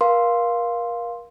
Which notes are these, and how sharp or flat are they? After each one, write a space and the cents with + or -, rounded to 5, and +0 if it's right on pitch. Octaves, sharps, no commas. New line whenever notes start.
A#4 +30 F5 +0 C6 +0